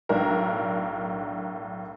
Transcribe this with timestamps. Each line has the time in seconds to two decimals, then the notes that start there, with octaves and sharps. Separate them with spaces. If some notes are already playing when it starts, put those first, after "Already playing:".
0.09 B1 A2 D4 A#4